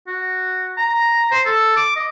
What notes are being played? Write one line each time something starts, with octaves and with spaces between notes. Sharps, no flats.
F#4
A#5
C5
A4
D6
D#5